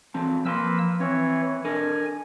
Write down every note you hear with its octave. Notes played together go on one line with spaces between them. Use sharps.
E3 C4 A5
F3 A#3 B4 G5 C6 E6
E3 C4 C#5
D4 A4 A#4 G#5